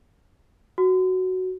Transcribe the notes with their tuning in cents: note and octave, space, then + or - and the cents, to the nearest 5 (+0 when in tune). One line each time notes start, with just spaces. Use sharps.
F#4 +5